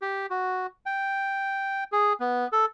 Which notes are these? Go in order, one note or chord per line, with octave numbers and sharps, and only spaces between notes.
G4
F#4
G5
G#4
B3
A4